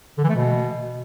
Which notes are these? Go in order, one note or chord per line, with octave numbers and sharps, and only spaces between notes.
D3
E3
A3
B2